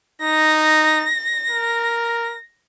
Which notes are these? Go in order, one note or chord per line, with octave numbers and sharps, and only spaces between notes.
D#4 A#6
A#4